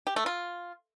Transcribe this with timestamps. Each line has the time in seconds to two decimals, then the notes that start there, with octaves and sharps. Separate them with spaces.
0.07 G4
0.16 A3
0.26 F4